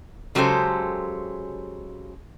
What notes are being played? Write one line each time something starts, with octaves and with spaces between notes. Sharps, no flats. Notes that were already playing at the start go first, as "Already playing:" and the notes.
C#3 F#3 G#3 G4 A4 C5